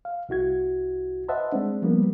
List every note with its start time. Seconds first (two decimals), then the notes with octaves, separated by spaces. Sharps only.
0.05 F5
0.29 C2 E4 F#4 G#6
1.28 B4 C5 D#5 E5 F#5 A5
1.52 G#3 C4 D4
1.82 F3 G3 A#3 B3